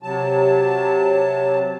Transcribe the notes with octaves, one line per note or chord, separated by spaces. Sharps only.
C3 F#3 A5